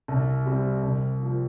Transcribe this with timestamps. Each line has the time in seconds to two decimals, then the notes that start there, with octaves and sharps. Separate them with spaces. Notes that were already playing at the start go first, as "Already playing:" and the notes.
0.08 C2
0.45 C3 G3 C4
0.83 C2
1.20 C3 F3 A#3